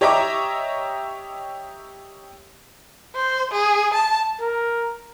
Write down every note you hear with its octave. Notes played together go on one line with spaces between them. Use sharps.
G4 C#5 D#5 E5 A#5 D6
C5
G#4
A5
A#4